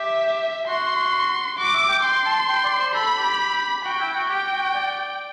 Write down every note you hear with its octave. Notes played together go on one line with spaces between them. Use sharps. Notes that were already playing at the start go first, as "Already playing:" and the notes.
Already playing: G4 E5
F#4 C6
F#4 D6
E5
G5
G5 C6
A5
G5
D5
C5
A4 B5
G4
F#4 G5
E4
F#4
G4 G5
F#4
D5